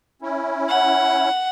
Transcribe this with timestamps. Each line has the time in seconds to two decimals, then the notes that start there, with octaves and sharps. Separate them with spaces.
0.22 C#4 E4
0.69 F#5